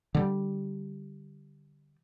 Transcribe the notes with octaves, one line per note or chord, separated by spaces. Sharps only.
D3 G3